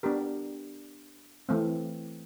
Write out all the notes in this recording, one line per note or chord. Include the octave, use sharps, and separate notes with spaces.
B3 D4 G4 A#4
E3 A3 C4